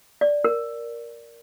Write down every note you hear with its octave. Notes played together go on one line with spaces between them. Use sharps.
D5
A#4